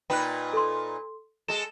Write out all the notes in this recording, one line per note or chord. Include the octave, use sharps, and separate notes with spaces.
A#2 D#4 B4 G5 B5 F#6
A4 C6
G#3 A4 E7